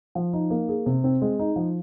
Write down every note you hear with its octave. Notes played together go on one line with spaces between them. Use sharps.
F3
D#4
A#3
G#4
C3
C4
G#3
D#4
F3